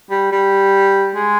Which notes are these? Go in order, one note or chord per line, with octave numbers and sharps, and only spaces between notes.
G3
G3
G#3